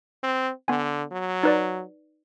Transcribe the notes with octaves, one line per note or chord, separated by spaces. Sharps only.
C4
D3 B3 G#5
F#3
D#4 B4 D5